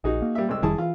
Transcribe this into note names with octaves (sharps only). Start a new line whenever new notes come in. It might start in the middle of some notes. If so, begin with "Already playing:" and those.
A#1 D#4 F#4 G#4
A#3
G3 E5
C2 G#3 E6
F1 D#3 G3 E4 G#4 A5
E3 F4